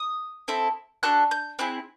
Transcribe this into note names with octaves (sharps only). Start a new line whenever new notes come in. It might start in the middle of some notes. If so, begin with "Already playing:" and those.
Already playing: D#6
C4 E4 A4
D4 F#4 A4 F#6
G6
C4 E4 G#4 F#6